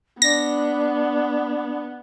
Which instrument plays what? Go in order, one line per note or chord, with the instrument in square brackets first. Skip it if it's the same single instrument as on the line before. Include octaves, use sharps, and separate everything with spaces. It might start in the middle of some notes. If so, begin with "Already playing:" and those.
[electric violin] B3 [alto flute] D4 [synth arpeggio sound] A#6